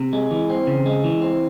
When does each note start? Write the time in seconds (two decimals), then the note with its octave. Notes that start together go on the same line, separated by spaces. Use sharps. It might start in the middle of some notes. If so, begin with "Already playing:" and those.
Already playing: C3
0.13 G#3
0.31 E3
0.50 C4
0.67 C#3
0.86 G#3
1.04 E3
1.21 C4